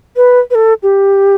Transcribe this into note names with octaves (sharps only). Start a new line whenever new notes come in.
B4
B4
A4
G4